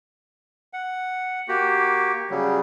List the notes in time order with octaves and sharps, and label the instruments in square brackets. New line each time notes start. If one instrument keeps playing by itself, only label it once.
[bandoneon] F#5
A#3 F#4 G4
C#3 F#3 G3